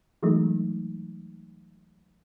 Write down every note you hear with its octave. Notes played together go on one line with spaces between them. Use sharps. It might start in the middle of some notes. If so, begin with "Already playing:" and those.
E3 F#3 G#3 A3 D#4